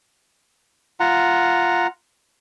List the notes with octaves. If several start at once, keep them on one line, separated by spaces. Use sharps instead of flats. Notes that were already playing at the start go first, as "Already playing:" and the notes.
F4 F#5 A#5